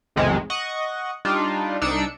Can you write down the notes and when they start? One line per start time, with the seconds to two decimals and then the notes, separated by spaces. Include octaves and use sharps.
0.16 B1 F2 A2 C3 D#3 G#3
0.50 D#5 F#5 C#6
1.25 G3 D4 D#4 F4
1.81 C2 D4 D#4 E6 C#7 D7